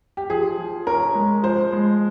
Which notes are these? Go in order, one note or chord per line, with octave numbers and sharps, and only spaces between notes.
G4
F3 G#4
F3
C#4 A#4
G#3
F3 C5
G#3